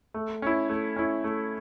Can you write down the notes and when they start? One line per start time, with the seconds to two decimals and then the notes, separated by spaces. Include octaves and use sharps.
0.14 A3
0.42 C#4 E4
0.69 A3
0.96 C#4 E4
1.24 A3